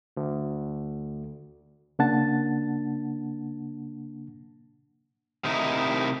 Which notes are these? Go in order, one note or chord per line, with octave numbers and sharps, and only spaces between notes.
D2
C#3 A#3 D4 F#5 A5 A6
C3 D#3 A3 D#4 E4